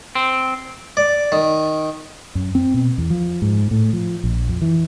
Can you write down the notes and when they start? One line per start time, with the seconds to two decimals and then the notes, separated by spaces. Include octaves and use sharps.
0.15 C4
0.97 D5
1.32 D#3
2.35 F#2
2.55 C4
2.74 B2
2.98 E2
3.10 F3
3.42 G#2
3.71 A2
3.93 F3
4.24 A#1
4.48 F2
4.62 E3